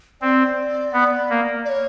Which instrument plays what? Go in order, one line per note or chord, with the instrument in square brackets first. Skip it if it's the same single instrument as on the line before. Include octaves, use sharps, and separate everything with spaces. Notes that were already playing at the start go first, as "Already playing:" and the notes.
[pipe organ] C4 [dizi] D5
[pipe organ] B3
A#3
[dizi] D5
C#5